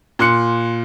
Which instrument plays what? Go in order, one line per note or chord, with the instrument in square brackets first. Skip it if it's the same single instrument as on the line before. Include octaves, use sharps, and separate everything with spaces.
[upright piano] A#2 C6 F#6 C#7